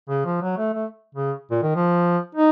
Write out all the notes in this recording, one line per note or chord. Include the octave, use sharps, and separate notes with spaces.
C#3
F3
F#3
A3
A3
C#3
A#2
D#3
F3
D#4